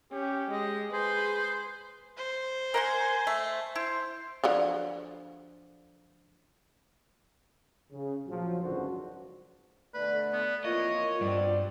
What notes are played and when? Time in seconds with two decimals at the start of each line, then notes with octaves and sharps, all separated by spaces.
0.13 C#4 G4
0.52 G#3 D#5
0.94 G#4 B4 C5
2.17 C5
2.74 A#4 F#5 G#5 C6
3.27 A3
3.75 E4 C5
4.44 D3 F3 F#3
7.93 C#3
8.27 A#1 F3 F#3
8.62 G#1 C#2 F#2 D3 F#4 C5
9.94 B2 D3 A3 B4 D5
10.33 B3
10.65 F2 E3 A#3 F4 C#5 D#5
11.21 G2 B2 C4 D5